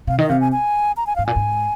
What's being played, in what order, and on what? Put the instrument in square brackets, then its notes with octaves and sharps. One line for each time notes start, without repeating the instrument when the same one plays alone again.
[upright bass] C3 [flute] F5
[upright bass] D#3 [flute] D#5
[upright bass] C3 [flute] F5
[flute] G#5
G#5
A#5
G#5
[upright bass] G#2 [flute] F5
[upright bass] A#2 [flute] G#5
[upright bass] G#2